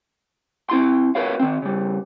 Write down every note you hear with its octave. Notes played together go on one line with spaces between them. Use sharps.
C4 E4 C6
F#4 A#4 B4 C#5 F5
D#3 C4
C#3 G3